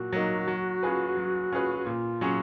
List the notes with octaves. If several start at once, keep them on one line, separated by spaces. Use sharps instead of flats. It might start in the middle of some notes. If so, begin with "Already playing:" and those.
Already playing: A#2 F#3 A#3 F#4
F#3 A#3 D#4
F#3
C#4 F4 G#4 B4
F#3
C#4 F4 G#4 B4
F#4
A#2 F4
F#3 C#4 G#4